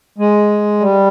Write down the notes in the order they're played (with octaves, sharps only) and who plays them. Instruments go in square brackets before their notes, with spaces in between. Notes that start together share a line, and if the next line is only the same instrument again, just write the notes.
[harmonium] G#3
G3